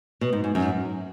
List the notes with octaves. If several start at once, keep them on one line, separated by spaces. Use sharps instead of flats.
B2
G#2
G#2
F#2